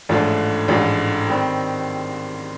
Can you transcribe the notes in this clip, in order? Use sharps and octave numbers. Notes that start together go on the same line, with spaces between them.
A1 G#2 F3 A3 D4
A1 G#2 F3 A3 D4
D#3 G3 C4